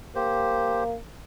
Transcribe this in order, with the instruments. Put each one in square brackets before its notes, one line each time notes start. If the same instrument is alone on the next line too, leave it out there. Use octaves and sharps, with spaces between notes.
[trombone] A#3 [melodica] G4 C5